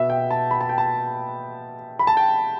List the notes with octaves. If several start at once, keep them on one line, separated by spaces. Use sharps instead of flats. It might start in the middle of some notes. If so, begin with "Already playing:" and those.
Already playing: B2 B3 E5
G5
A5
B5
A5
G5
A5
B5
A5
G5